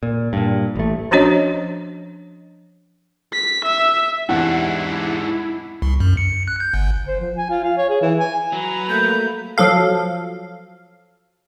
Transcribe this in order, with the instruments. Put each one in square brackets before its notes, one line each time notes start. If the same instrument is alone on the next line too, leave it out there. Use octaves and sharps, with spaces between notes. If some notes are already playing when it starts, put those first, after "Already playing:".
[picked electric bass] A#2
G2 A#2
A1 A3
[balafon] F3 C#4 D4 F#4 C#5 D#5
[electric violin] B6
E5
[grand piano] E2 C3 [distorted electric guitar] G#2 D4 [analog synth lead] E4 [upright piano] F#5
[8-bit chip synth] C2
F#2
C#7
F#6
G6
G1
[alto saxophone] C5
F3
G#5
F4
F5
C#5
G#4
E3
G#5
[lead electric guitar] F#3 [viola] B4 A#5
[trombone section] A3 A#3 [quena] G6
[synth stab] F3 F#3 A4 F5